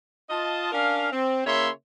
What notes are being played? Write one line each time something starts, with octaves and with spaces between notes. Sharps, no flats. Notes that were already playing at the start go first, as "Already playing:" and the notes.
F4 D#5 A5
C#4 D4 A#4 F5
C4
C#3 A#3 E4 C#5 E5 C6